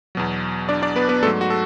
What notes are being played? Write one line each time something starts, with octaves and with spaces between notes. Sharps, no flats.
E2 B2 F#3
D4 D5
D4 D5
B3 B4
B3 B4
G#2 F#3 A3 A4
F#4
A4